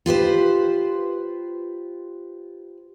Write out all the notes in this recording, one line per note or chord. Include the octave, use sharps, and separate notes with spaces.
F4 G4 B4 C5